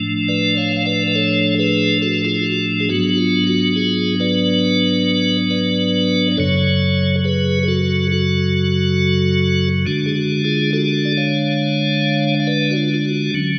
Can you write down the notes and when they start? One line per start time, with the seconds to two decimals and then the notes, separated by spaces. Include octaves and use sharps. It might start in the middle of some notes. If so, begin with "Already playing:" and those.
Already playing: A2 F3 A3 D4
0.28 B4 D5
0.57 C#5 F5
0.77 F5
0.86 B4 D5
1.08 B4
1.15 A4 C#5
1.58 G#4 B4
2.02 F#4 A4
2.25 F4 G#4
2.39 F4
2.46 F#4
2.80 G#4
2.89 G#2 F#3 B3 D4 F#4
3.13 F#4
3.18 F4
3.47 F#4
3.76 F4 G#4
4.20 B4 D5
5.50 B4 D5
6.32 D5
6.37 F#2 C#3 F#3 A4 C#5
7.24 G#4 B4
7.63 G#4
7.68 F#4 A4
8.12 F#4 A4
9.86 D3 G#3 D4 F#4
10.06 G#4
10.16 F#4
10.44 F4 G#4
10.73 F#4 A4
11.05 D5
11.17 C#5 F5
12.40 F5
12.47 B4 D5
12.71 F#4
12.76 F4
12.94 F4
13.05 F#4
13.34 D3 F#3 C#4